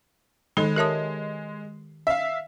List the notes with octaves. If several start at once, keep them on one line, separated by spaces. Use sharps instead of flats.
D#3 G#3 D#4 A4 B5
G4 A#4 C#5 E5 A5 D#6
E5 F5